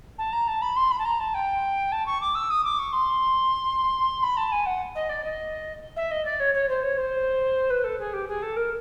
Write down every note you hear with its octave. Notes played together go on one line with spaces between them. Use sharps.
A5
A#5
A5
B5
C6
B5
A5
A#5
A5
G5
A5
C#6
D6
E6
D#6
D6
C#6
C6
B5
A5
G#5
F#5
D#5
D5
D#5
E5
D#5
D5
C#5
C#5
C5
C#5
C5
B4
A4
G#4
G4
G#4
A4
A#4